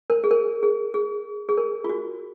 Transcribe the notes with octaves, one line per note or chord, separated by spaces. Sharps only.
A#4
G#4
A#4
G#4
G#4
G#4
A#4
F4
F#4